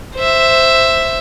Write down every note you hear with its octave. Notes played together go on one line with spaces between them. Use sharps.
C5 E5